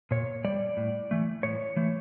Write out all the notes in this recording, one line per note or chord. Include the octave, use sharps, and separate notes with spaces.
A#2 C#5
G3 D5
A2
E3 A3
A2 C#5
E3 A3